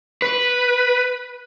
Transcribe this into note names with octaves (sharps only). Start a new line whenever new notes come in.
B4